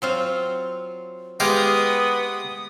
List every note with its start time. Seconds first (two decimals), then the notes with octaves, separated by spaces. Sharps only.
0.02 F#3 C4 F4
1.40 G#3 B3 G4 D#5 F5 D#6